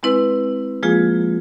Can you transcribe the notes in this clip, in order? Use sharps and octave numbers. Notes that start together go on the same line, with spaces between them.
G#3 C4 E4 B4
F3 G#3 A#3 F4 G#4